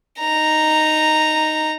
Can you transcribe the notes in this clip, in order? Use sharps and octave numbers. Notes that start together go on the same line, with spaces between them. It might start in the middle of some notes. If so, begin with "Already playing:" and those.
D#4 A#5